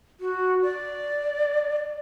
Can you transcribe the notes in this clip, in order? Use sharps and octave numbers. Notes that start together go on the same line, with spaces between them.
F#4
D5